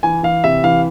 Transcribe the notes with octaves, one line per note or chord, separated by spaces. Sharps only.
E3 G#5
E3 F5
C3 E5
E3 F5